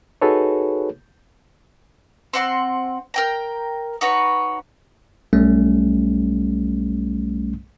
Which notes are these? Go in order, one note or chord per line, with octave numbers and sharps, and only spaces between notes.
D#4 F#4 G#4 A4 B4 C#5
C4 F#5 C6
A#4 G5 A#5
D#4 F#4 B4 C#5
B1 G3 A3 C#4